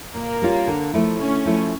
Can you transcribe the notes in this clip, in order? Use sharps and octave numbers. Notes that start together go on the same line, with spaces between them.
A#2 A#3
G3 C#4 F4
D3
F3 A3 E4
D3 C#4
F3 A3 E4